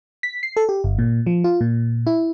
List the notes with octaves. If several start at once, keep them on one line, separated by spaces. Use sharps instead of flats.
B6
C7
A4
G4
G1
A#2
F3
F4
A#2
E4